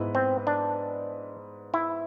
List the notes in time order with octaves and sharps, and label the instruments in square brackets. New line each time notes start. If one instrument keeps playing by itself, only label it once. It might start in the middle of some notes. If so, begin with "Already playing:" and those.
Already playing: [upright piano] G#2 G#3 B3 E4 B4
[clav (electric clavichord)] C4
D4
E4